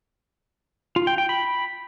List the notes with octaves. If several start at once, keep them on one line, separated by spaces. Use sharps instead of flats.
F4
G5
G5
B5